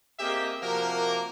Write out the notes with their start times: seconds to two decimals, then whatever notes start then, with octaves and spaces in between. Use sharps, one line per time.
0.19 A#3 C4 G4 G#4 D#5 E5
0.61 C3 F3 A#3 F#4 G4 A#4